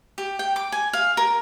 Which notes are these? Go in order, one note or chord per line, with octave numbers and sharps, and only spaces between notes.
G4
G5
D6
G#5
F5
A#4